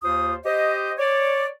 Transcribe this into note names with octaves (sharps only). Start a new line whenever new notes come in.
D#2 F4 C5 D#6
G4 C5 D#5
C#5 D5